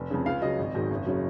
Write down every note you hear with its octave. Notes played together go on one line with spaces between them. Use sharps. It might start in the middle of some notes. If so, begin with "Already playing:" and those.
Already playing: F1
F2 C#3
C#2 F5
C#3 F#3 D#5
G#1
G#2 D#3 F#3
F#1
C#3 F#3